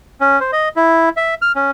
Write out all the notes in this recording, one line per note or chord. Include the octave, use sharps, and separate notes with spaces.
C#4
C5
D#5
E4
E5
F6
C#4